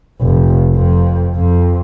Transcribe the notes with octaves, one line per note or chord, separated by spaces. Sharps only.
F1
F2
F2